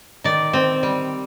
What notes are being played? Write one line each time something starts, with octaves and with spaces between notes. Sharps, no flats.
D#3 D5
C4
G3